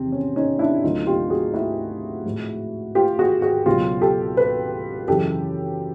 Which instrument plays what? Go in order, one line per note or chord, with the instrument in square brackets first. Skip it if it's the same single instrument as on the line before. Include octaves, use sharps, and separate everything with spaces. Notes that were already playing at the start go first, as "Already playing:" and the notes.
Already playing: [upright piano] E2 C3 D#3 C4
C#4
C#4 D#4
D4 E4
D2 D3 F#3 A3 D#4 F4
F4 G4
F#4 G#4
E4 F#4
A2 F3 G#3
F4 G4
F#4 G#4
F#4 G#4
C#2 B2 F#3 F4 G4
G4 A4
A4 B4
F#2 C#3 E3 G#3 G4 A4